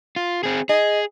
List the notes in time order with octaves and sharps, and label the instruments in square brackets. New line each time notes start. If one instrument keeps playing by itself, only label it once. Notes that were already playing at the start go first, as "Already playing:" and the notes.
[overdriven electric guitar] F4
C4 G#4
[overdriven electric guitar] G#4 [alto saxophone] D#5